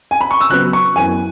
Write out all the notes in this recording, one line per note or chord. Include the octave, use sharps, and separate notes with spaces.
G#5
B5
C#6
E6
C#3 F#3 B3 F#6
C#6
F#2 E3 B3 G#5